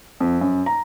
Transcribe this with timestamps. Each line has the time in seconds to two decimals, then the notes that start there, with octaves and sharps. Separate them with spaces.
0.20 F2
0.41 F#2
0.66 A#5